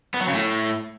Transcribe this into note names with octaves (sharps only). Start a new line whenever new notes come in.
B3
F#3
C#3
A2